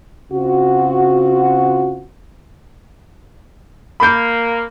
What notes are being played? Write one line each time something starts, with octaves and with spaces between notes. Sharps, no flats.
C#3 C4 F4 F#4
A#3 B5 G6